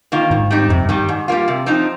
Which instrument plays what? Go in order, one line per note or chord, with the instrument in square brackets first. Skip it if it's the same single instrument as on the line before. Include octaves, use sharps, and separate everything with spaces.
[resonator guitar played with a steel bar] D#3 A#3 F4
[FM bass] G#2 [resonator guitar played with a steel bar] D#3
[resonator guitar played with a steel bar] G3 C4 D#4
[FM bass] F2 [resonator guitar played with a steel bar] C3
[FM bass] G2
[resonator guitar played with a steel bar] D#3 G3
G#2
G3 A#3 F4
C3
F3 C4 D#4